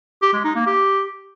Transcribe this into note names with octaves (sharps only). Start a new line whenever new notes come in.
G4
G#3
D#4
A#3
G4